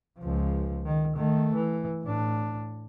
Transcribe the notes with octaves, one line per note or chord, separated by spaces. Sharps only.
C#2 F3
D#3
D#3 A3
E3
A2 D4